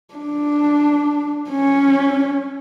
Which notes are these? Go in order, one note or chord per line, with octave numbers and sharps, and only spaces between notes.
D4
C#4